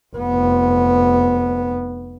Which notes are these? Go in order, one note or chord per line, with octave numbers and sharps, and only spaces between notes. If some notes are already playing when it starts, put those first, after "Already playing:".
F1 B3